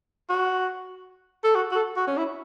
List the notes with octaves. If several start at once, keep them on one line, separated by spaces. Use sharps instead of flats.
F#4
A4
F#4
F#4
A4
F#4
C#4
E4